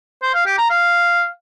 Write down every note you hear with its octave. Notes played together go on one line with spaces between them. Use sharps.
C5
F5
G4
A#5
F5